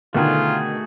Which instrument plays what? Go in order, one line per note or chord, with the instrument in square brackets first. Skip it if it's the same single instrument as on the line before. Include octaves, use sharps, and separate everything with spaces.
[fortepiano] B2 D#3 [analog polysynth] D3 [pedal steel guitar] A3 F#4 G#4 [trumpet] F4